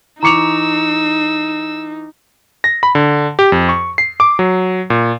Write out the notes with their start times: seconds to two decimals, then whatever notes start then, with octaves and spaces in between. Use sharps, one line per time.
0.23 E3 D#4 A#5 C#6 D6 E6 C#7 F7
2.64 A#6
2.83 B5
2.95 D3
3.39 G4
3.52 F2
3.69 C#6
3.98 C7
4.20 D6
4.39 F#3
4.90 A#2